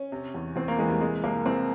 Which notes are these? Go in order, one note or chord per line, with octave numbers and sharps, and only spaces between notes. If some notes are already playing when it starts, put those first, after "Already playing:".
Already playing: C#4
C3
E2
E2 C4
A#3
E3 G#3
G3
C3 G#3
C2 A#3
C2 C4